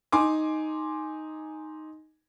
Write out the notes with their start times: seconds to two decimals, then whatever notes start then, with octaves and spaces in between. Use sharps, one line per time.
0.12 D#4 G#5 C6 D6